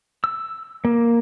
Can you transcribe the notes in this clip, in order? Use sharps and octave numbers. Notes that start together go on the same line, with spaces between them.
E6
A#3